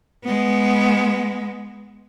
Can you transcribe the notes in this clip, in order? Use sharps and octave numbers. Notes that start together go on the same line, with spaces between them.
G#3 B3